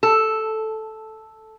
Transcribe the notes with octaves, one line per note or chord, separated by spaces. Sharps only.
A4